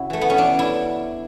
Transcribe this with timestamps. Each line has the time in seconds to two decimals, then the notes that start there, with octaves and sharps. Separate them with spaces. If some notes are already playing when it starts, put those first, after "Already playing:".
Already playing: C#3 E4 F#4
0.10 E3 A3
0.21 B3
0.30 C#4
0.37 E3 D4
0.59 E4